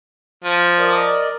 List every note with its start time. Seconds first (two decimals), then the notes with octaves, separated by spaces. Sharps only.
0.44 F3
0.79 A#4 D5 D#5